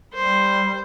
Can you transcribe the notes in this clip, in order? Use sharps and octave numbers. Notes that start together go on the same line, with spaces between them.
G3 C5